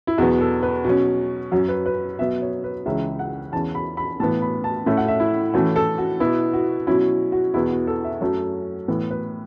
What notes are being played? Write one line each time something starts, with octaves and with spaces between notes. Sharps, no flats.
E4
E2 B2 F#3 B3 F#4
A4
B4
B2 F#3 C#4
F#2 F#3 C#4 F#4
B4
B4
B2 F#3 B3 E5
C#5
B4
C#2 C#3 E3 C#4 E5
F#5
E2 E3 C#4 A5
B5
B5
A2 E3 B3 A5
B5
A5
A2 A3 C#4 E5
F#5
E5
E4
A2 E3 A3 C#4 F#4
A4
F#4
B2 B3 E4
F#4
B2 F#3 C#4 E4
F#4
E2 B2 B3 E4
F#4
A4
E5
F#2 F#3 A3 C#4 C#5
A2 E3 B3
B4